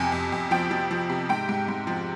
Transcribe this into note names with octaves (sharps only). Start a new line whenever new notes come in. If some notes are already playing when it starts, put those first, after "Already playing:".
Already playing: F2 C3 G#5
F2
F2
F3 G5
F3
F3
C3
G#2 G5
G#2
G#2
F3